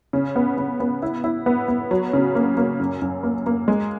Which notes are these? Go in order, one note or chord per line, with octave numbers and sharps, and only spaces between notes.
C#3
B3
C#3
B3
E4
E4
B3
B3
F#3
C#3
A#3
A#3
F#2
F#2
A#3
A#3
G#3